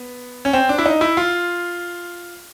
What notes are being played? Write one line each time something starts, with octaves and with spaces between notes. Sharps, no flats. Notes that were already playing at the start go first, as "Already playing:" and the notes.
Already playing: B3
C#4
C4
D4
E4
D#4
E4
F4